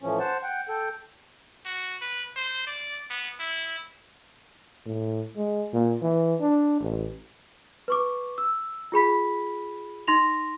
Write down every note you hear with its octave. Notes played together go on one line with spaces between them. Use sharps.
A2 E3 F3 C#4
C5 F#5 A5
F#5 G5
A4 G5
F#4
B4
C5
D5
B3
E4
A2
G#3
A#2
E3
D4
A1
B4 C#6 D6
E6
F4 G#4 B5 B6
D#4 C6 A#6 F7